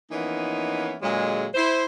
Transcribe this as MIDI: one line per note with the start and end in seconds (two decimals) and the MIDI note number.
0.11 0.95 52
0.11 0.95 53
0.11 0.95 58
0.11 0.95 59
0.11 0.95 61
0.11 0.95 63
1.02 1.47 46
1.02 1.47 50
1.02 1.47 54
1.02 1.47 56
1.55 1.85 64
1.55 1.85 72